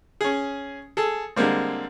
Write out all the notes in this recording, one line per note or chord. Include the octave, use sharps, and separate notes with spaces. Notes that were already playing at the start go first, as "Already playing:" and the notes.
C#4 G#4
G#4 A4
D3 G3 G#3 A#3 C4